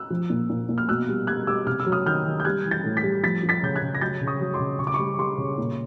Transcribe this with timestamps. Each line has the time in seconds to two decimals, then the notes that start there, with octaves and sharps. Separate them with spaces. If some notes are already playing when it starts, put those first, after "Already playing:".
Already playing: E6 F#6
0.10 F3
0.30 A#2
0.50 A#2
0.69 A#2
0.78 F6
0.89 B2 E6 F#6
1.09 G3
1.27 G3 F#6 G#6
1.47 G3 D6 E6
1.67 C3 F6
1.80 E6
1.86 F#3
1.92 D#6 F6
2.06 D#3 F6 G6
2.25 D#3
2.40 G6
2.45 G3 F#6 G#6
2.65 E3
2.71 G6 A6
2.84 A2
2.97 A6 B6
3.03 G3
3.23 F3 A6 B6
3.43 F3
3.49 A6 B6
3.63 C#3 G6
3.76 F#6 G#6
3.82 C#3
3.95 A#6
4.01 F#3 G6 A6
4.21 C#3
4.27 C#6 D#6
4.41 F#3
4.54 C6 D6
4.60 C#3
4.79 C#3 C#6
4.87 D6
4.94 G3 B5 C#6
5.19 G3 C6 D6
5.38 C#3
5.58 A#2